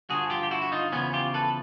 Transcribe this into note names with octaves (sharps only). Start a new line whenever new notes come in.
G2 D3 F3 F#4 G#4
F4 G4
G4
E4 F#4
F#4
D#4 F4
E2 C#3 F3 B3 C#4
F4 G4
A4 B4